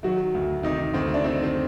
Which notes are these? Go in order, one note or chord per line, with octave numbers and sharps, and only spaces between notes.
D#3 F#3 F#4
D2
C3 D#3 D#4
D2 C4
D4
D#3 C4
C4